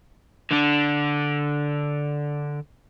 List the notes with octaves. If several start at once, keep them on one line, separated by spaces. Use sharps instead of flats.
D3 D4